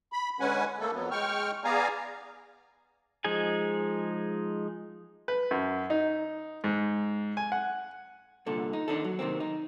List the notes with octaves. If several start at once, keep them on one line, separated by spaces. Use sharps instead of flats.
B5
D3 G#3 C#4 B4 F#5 G#5
A3 A#3 A4
F2 F#3 B3
G#3 G5 C#6 F6
B3 G#4 D5 F5 G#5 A#5
F3 G#3 D#4 G#4 G#5
B4
F#2
D#4
G#2
G#5
F#5
C2 A#2 D3 A4
D#4
D#3 D4 D#4 A4
F#3
C3 D#3 A#3 C4
D#4